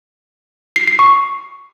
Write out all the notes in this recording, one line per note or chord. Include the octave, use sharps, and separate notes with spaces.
C7
C7
C#6